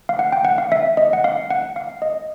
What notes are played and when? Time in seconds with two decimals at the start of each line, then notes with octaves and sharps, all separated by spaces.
0.09 F5
0.19 F#5
0.32 G5
0.45 F#5
0.58 F5
0.72 E5
0.97 D#5
1.13 F#5
1.24 F5
1.50 F#5
1.76 F5
2.02 D#5